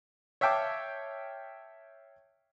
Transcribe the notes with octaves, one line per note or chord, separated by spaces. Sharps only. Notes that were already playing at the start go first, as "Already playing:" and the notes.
C#5 E5 F5 G5 A5 D6